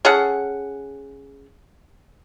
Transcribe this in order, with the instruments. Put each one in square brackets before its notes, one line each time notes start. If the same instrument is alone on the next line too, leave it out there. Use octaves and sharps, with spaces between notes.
[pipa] C#4 G#4 A4 F#5